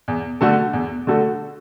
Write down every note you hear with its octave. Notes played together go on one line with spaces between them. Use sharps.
E2
D3 A3 F#4 A4
E2
D3 A3 F#4 A4